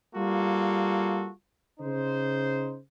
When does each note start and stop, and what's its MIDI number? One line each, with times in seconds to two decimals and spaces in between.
0.15 1.30 55
0.15 1.30 58
0.15 1.30 65
0.15 1.30 66
0.15 1.30 69
1.80 2.77 49
1.80 2.77 63
1.80 2.77 72